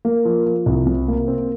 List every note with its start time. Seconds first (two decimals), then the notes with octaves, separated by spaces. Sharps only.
0.05 A#3
0.25 F3
0.46 F3
0.66 C2
0.86 C3
1.08 A#3
1.28 C4